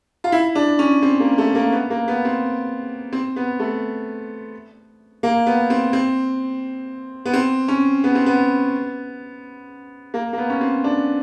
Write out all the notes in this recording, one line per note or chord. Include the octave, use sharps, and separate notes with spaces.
F4
E4
D4
C#4
C4
A#3
A3
A#3
B3
A#3
B3
C4
C4
B3
A3
A#3
B3
C4
C4
B3
C4
C#4
B3
C4
B3
A#3
A#3
B3
C#4
C4
D4